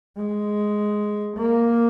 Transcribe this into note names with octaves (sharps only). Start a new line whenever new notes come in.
G#3
A#3